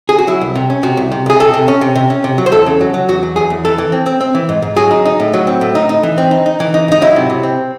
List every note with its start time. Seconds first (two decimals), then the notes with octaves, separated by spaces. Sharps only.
0.09 G#4
0.18 F#4
0.27 F#3 E4
0.41 C2
0.55 C3
0.70 C#4
0.83 C3 F#4
0.97 C2
1.12 C3
1.26 C2 G#4
1.40 C3 A4
1.54 C3
1.68 C#4
1.81 C3
1.95 C3
2.10 C#4
2.24 C3
2.38 F#3
2.46 C5
2.52 E2 A4
2.66 C#3
2.81 F#3
2.94 F#3
3.08 E2 F#4
3.23 F#3
3.36 E2 G#4
3.50 E2
3.65 E3 A4
3.78 E3
3.92 C4
4.06 C4
4.21 C4
4.35 E3
4.49 G#2
4.62 G#2
4.76 F#3 G#4
4.91 D#4
5.05 D#4
5.20 A2
5.33 F#3
5.47 C4
5.61 A2
5.75 D#4
5.89 D#4
6.03 E3
6.18 C4
6.31 D#4
6.46 D#4
6.60 E3
6.74 D#4
6.88 G#2 D#4
7.01 F#3 E4
7.16 C3
7.30 C3
7.43 C4